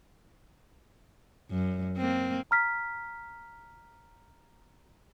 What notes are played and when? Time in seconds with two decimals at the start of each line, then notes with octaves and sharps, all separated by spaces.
1.50 F#2
1.97 A#3 C4
2.51 A#5 F6 B6